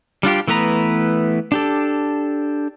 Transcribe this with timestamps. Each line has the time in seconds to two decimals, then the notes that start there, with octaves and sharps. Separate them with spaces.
0.23 G3 D4 F4 G4
0.48 E3 A3 B3 B4 A#5
1.52 D4 G4 A4